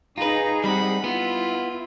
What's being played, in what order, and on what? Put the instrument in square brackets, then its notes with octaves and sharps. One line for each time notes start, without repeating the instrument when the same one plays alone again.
[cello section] D#4 G#4 [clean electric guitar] F4 B4 [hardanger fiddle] A#5
[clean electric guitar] G3 C4 [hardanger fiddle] F#5 B5
[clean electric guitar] B3 [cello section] E4 [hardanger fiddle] F4